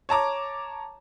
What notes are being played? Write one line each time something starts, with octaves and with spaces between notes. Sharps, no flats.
C#5 A5 A#5 D6